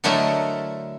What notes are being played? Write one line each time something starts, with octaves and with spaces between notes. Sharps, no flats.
D3 F#3 A3 E4 A#4 D#5